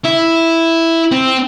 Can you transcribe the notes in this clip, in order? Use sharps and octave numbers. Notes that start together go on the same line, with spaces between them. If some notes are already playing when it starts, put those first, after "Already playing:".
E4
C4